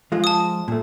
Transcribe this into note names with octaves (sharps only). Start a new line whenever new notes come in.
F3 G#3 F4
A5 D#6
A#2 A3